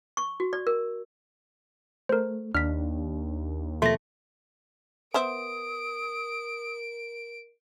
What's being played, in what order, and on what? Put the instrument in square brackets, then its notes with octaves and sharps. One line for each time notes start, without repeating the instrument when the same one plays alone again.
[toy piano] C#6
F#4
D5
A#4
[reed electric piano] A3 [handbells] A#4 C5
[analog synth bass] D#2 [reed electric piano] D4 [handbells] F6 B6
[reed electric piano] B2 F3 A#3 [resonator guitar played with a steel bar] A3 [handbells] C6 A#6
[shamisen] B3 C5 E5 [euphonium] A#4 [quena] D#6 [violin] D7